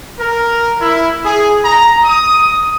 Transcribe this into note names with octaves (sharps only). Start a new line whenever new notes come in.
A#4
E4
G#4
A#5
D#6